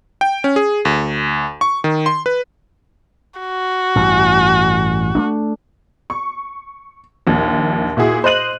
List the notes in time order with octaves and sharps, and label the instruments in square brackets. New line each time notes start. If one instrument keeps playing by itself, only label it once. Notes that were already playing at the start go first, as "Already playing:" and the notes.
[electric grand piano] G5
C#4
G#4
D2
C#6
D#3
C6
B4
[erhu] F#4
[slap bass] A1 G2
A3 A#3 D4
[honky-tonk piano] C#6
A#1 D#2
A#2 E4 F#4 G#4
C5 D#5 F#6 D#7 F#7